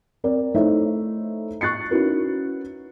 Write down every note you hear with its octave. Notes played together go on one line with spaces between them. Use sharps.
C4 A#4 D5
A3 D#4 E4 C5 C#5 E5
C#6 F#6 A6 C7 C#7
C#4 D#4 E4 F#4 A#4 B4